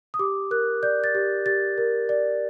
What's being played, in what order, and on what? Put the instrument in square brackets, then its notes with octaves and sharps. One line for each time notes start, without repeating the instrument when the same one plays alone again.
[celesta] D#6
G4 D6
A#4 F#6
D5 G6
A6
G4
G4 A6
A#4
D5